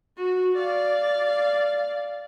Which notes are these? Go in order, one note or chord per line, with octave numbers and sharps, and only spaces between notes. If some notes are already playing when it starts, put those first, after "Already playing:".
F#4
D5 F5